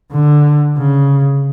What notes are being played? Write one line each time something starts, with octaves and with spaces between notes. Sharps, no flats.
D3
C#3